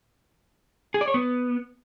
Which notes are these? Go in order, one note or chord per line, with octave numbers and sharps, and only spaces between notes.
G#4
D5
C#5
B3